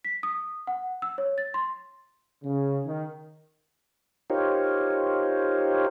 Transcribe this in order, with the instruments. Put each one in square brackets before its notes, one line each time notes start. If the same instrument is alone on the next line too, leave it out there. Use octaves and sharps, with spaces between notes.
[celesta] B6
D#6
F#5
E6
C#5
A6
C6
[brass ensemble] C#3
D#3
[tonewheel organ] D#4 F4 G4 A#4 C5 C#5